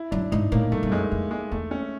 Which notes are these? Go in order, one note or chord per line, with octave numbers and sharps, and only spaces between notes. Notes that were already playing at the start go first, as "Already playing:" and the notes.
Already playing: E4
F#2 D4
G#2 D#4
A2 A#3
G2 A3
G2
A3
F#2 G#3
F2
G#3
E2 A3
C#4